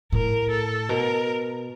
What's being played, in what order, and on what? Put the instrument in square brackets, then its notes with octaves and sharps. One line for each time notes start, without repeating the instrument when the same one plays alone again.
[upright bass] A2 [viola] A#4
[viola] A4
[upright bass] B2 [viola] A#4